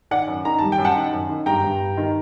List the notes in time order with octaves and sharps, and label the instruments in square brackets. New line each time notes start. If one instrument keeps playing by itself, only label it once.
[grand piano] D#3 D5 F#5
F#2
D#3 A#5
G3 A5
G5
F#2
F#5 A5
D#3
F#2
D#3
G2 G5 A#5
G2
G2
D#3